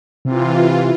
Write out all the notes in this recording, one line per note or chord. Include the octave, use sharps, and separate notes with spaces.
C3 E3 F4